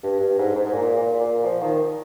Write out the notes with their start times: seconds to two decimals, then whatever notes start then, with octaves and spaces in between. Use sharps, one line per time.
0.03 G2
0.20 G2
0.38 G#2
0.56 G#2
0.66 G#2
0.74 A#2
0.97 A#2
1.20 A#2
1.45 F3
1.62 D#3